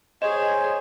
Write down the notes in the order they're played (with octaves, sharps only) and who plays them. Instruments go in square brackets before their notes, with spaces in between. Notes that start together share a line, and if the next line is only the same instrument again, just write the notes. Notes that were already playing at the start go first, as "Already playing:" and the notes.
[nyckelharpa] G#4 [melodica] C5 C#5 [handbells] D#5